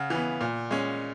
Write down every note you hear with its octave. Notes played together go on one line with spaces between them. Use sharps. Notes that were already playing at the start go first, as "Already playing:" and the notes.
Already playing: C#3 F#5
E3 B3
A#2
G#3 C#4